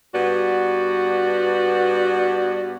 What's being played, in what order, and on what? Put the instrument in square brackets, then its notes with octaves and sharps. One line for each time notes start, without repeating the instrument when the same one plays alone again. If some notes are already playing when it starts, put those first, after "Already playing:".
[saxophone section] G2 B3 F#4 D5